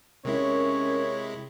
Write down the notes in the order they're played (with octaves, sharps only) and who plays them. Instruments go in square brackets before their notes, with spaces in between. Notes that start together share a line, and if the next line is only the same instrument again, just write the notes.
[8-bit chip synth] C3 G#3 E4 [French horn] C#4 [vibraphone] A#4 [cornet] C#5